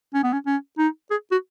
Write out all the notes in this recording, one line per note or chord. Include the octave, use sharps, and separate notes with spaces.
C#4
B3
C#4
C#4
D#4
G#4
F#4